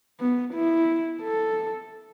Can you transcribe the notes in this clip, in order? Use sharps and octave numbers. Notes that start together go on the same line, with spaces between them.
B3
E4
A4